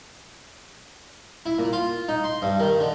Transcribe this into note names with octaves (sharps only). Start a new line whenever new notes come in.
E4
A#2
F4
D#4
C6
G2
D#3
D3